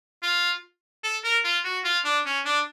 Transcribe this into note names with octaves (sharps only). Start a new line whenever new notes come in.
F4
A4
A#4
F4
F#4
F4
D4
C#4
D4